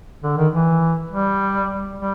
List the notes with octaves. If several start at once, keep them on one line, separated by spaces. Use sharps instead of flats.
D3
D#3
E3
G3
G3